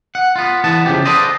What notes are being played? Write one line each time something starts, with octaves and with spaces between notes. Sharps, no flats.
F#5
B3 F4
E3 B3 A5
C#3 F3 G4
A4 B4 C5 D5 D#5